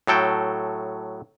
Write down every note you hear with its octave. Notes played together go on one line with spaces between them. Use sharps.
A2 F#3 A4 G5